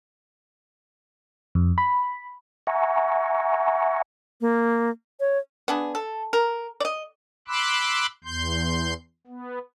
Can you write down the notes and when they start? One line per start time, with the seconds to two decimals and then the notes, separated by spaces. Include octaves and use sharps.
1.55 F2
1.78 B5
2.67 E5 F#5 G#5 A#5 C#6
4.41 A#3
5.20 C#5
5.68 B3 D4 G#4
5.95 A4
6.33 A#4
6.80 D5 D#5
7.48 B5 C6 D6 E6 F#6
8.24 E2 C6 G6
9.27 B3